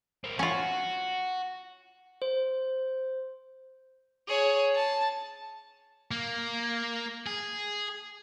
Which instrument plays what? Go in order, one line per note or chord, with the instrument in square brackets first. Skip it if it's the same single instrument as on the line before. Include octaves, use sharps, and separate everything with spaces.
[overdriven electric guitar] C4 A#4
[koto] C#4 F4 [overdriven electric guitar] F#4
[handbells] C5
[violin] G#4 C#5
A5
[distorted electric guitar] A#3
G#4